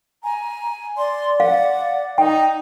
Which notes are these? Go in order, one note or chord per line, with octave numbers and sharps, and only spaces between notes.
G#5 A#5
D5 C6
F5 F#5
D#4 G5